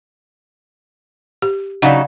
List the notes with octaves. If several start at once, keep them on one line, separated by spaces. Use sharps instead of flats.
G4
C#3 F#3 D#4 D5 F5 F#5